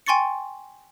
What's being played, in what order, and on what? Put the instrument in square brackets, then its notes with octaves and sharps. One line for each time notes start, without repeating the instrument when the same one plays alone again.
[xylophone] G5 G#5 C6 C#6 A6 C#7